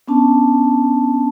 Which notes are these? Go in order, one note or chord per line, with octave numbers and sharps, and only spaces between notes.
B3 C#4 D4 A5